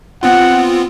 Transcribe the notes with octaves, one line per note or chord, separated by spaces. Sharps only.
B3 C4 F4 F#5